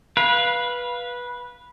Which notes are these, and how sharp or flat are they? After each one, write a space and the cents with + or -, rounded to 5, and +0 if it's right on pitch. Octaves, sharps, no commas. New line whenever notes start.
B4 -15 F5 +0